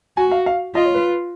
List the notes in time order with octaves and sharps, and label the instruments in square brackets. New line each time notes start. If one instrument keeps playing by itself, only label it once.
[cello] F#4 [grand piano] G#5
[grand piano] F5
F5
[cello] F4 [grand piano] D#5
[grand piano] C#5
B4